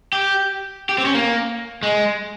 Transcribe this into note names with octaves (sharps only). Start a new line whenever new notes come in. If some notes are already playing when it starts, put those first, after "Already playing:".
G4
G4
C4
C#4
A#3
G#3